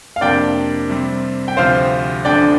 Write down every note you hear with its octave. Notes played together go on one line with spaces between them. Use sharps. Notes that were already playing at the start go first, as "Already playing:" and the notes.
F5
F2 C3 A#3 D4 D5 G5
C3 G3 C4
G5
D2 C3 F3 C4 C5 F5
D2 D3 F3 D4 D5 G5